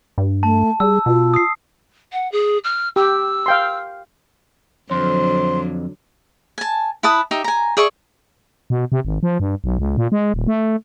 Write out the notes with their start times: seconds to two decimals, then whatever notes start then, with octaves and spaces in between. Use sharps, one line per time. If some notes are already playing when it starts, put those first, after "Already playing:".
0.18 G2
0.43 A3 A5
0.80 G3 G#4 E6
1.06 B2 F4
1.34 D#6 C7
2.13 F#5
2.32 G#4
2.64 F6
2.96 G4 E6
3.46 F5 G5 C6
4.91 F2 D3 F#3 C5 C6
6.58 G#5 A5
7.03 E4 B4 A5 D#6
7.31 D#4 G4 E5
7.44 G#5 A#5
7.77 G#4 D5 E5 C#6
8.70 B2
8.92 C3
9.05 G#1
9.23 F3
9.40 G2
9.64 B1
9.79 C#2
9.97 A#2
10.12 G#3
10.34 D#1
10.47 A3